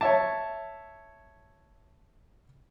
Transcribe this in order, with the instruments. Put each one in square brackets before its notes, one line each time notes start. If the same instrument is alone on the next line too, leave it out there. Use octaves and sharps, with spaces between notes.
[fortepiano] C#5 E5 A5